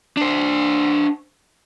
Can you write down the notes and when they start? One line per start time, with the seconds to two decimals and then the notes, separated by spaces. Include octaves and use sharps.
0.17 D4 C5